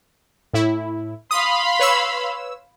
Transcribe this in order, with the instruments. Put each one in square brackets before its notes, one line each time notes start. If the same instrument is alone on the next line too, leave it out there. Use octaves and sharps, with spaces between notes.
[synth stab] A2 E4
[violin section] F5 B5 C6 [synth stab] D#6
[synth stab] B4 C#5 E6